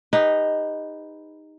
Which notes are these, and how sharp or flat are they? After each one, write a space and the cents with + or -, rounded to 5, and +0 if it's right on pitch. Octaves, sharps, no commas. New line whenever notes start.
D#4 +0 G4 +40 B4 +0